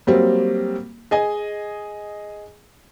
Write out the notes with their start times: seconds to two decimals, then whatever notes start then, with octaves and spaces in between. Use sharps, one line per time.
0.07 F#3 G3 A#3 C4
1.11 G#4 D#5 G#5